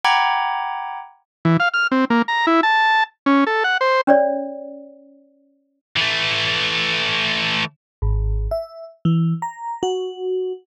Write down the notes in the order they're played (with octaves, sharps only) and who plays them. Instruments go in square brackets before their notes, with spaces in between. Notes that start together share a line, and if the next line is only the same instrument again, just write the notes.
[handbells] F#5 G5 A#5 B5 D6 G#6
[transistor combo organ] E3
F5
F6
C4
A#3
A#5
E4
A5
C#4
A4
F#5
C5
[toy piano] C#4 C#5 D5
[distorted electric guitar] E3 A3
[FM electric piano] G#1
E5
E3
A#5
F#4